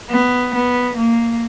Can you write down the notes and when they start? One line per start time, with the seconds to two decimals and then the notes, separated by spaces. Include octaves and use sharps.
0.10 B3
0.54 B3
0.97 A#3